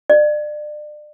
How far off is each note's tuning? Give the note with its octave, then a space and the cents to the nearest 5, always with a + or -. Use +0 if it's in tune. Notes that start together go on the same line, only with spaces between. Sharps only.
D5 +35